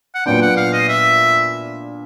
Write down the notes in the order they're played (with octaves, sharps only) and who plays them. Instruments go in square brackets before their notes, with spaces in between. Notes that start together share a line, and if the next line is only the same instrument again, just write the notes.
[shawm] F#5
[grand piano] A#2 F#3 B3 D4 [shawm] G5
[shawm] F#5
F5
D#5
E5